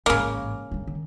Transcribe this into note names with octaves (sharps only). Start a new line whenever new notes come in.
A1 G#2 C#3 A#3
G2 D#3
D#3